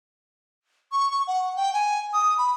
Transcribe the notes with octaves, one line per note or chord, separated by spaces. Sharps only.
C#6
C#6
F#5
G5
G#5
D#6
B5